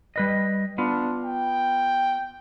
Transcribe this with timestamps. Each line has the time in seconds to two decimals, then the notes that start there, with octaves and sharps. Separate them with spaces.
0.16 G3 B4 D#5
0.78 B3 D4 F4
1.24 G5